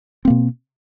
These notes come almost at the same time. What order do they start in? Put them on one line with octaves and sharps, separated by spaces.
C4 A#3 B2